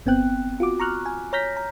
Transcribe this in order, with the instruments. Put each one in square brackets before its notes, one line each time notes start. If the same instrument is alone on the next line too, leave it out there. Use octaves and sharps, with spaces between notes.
[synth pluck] G1 B3 C4 G5 F#6
F4 F#4 D6
A#5 C#6 F6 F#6
G#5
C#5 A#5 F6 G6 A#6 B6
A#5